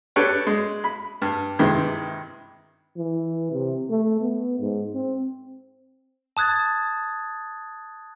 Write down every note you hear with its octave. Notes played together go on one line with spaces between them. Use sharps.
D4 G4 A4 B4 C#5 G5
G#3
B5
G2
G2 C3 D#3 E3 G#3
E3
C3
A3
B3
G#2
C4
A5 D#6 F#6 G#6 A6